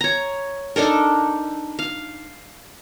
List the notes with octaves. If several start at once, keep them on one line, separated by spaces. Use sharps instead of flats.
C#5 A#5
D4 D#4 A4 A#4
F5